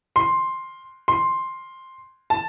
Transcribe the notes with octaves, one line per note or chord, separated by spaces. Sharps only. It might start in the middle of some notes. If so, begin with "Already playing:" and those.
C6
C6
A5